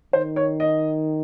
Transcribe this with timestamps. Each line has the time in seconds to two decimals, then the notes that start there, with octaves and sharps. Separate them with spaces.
0.13 D#3 C5
0.36 C#5
0.60 D#5